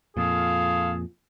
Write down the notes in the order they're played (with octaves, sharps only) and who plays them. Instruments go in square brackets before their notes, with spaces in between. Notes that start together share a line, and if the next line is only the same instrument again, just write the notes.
[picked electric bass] F2 A#2 [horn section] F4 A4 F5 [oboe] G#4